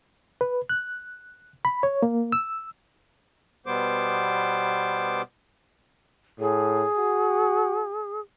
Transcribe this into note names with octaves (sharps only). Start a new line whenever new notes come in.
B4
F#6
B5
C#5
A#3
E6
B2 G3 B3 C5 D6
A2 G#4
F#4